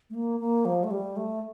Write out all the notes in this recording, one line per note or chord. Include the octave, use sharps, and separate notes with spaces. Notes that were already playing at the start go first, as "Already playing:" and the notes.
A3
A#3
A#3
F3
A3
G3
A3